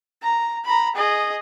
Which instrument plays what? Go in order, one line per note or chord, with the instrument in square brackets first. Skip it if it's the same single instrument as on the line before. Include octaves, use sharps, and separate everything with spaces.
[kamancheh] A#5
A#5 B5
G#4 D#5